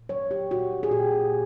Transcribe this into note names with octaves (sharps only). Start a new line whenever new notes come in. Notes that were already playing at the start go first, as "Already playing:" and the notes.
Already playing: A#2
F#3 C#5
G4
A#2 F#4
G#4
A#2 G4